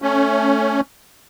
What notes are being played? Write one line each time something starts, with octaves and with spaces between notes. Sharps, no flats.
A3 C#4